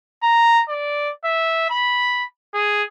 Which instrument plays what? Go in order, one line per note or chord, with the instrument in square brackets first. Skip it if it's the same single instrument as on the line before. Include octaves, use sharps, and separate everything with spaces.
[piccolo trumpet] A#5
D5
E5
B5
G#4